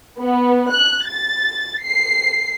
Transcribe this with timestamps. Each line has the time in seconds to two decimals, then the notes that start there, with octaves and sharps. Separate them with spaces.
0.20 B3
0.73 F#6
1.08 A6
1.84 C7